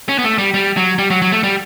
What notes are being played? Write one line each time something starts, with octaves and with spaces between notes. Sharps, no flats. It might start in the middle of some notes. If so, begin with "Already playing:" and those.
C#4
B3
A3
G3
G3
F#3
G3
F#3
F#3
A3
G3